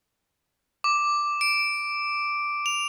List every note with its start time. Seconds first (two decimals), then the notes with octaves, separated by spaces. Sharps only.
0.84 D6
1.41 D7
2.66 F7